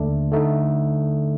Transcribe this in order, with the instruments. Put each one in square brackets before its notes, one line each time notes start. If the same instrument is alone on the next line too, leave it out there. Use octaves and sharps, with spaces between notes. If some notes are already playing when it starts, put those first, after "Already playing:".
Already playing: [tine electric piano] D#2 D3 A3 D4
D3 A3 D#4